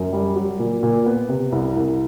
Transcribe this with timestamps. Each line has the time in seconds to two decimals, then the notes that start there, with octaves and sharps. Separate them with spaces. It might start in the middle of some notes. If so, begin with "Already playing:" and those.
Already playing: F#2
0.13 G3
0.36 F#3
0.59 A#2
0.83 A#2
1.06 B3
1.29 C3
1.52 C2
1.76 C2